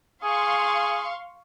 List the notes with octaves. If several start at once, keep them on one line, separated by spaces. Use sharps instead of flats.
G#4 F5 C6 C#6